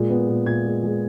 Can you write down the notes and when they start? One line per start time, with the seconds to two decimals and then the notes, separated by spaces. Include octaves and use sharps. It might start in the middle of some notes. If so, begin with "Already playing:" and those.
Already playing: A#2 G#3
0.10 B3
0.29 A#2
0.46 A#2 G#6
0.65 G#3
0.83 G#3